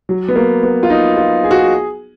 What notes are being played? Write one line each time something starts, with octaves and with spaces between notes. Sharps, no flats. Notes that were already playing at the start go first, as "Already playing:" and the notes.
F#3
B3
A#3
B3
F4
D#4
F4
G#4
F#4
G#4